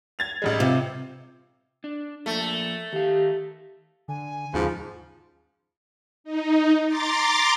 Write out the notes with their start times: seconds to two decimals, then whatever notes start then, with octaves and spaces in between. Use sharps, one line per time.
0.19 G#6 A6 F7
0.42 A1 G3 G#3
0.60 C3 F4
1.84 D4
2.26 F3 A3 A#3
2.92 D#3 G4 F5
4.08 D3 G#5
4.54 D#2 G#2 C#3 F3
6.24 D#4
6.87 A#5 C6 D6 A6